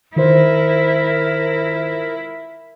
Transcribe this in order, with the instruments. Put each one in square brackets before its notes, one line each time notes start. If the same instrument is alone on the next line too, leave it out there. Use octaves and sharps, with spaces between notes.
[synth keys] D#3 F4 C5 [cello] E4 [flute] A#4